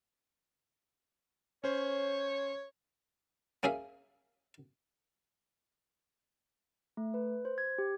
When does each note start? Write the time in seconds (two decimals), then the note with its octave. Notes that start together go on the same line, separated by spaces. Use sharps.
1.64 C#4 C5 C#5
3.63 A#3 C#4 G#4 E5 F5
6.97 A3
7.14 B4
7.45 C5
7.58 G#6
7.78 G4